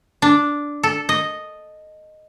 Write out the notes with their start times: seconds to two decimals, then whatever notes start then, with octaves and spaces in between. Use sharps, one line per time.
0.22 D4
0.83 A4
1.09 D#5